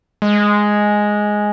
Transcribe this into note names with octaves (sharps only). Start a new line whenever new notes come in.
G#3